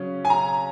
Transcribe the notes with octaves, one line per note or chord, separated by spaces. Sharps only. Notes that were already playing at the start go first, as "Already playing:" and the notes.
Already playing: C#3 F#3 C#4
G#5
A#5